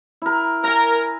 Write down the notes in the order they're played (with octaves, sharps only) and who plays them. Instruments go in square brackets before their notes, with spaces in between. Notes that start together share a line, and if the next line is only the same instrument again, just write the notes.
[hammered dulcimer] E4 A#4
[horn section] A#4 [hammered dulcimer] G#5 A#5